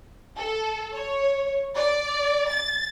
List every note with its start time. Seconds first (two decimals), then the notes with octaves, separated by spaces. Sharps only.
0.36 A4
0.93 C#5
1.75 D5
2.49 A6